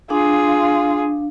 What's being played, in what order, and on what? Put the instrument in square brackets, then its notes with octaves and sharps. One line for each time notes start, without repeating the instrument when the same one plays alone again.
[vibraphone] D4 F5 [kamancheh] F4 G#4